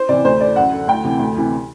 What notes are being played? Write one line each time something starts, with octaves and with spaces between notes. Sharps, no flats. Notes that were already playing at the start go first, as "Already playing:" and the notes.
Already playing: C5
C3 E3 D5
D2 C5
D3 D5
F#2 F#5
D3
D2 G5
C3 E3
D2
C3 E3